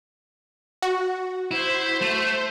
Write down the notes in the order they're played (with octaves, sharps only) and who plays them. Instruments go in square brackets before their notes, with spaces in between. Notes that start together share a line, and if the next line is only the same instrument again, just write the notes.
[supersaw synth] F#4
[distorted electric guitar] E4 [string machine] C5
[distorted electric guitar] A3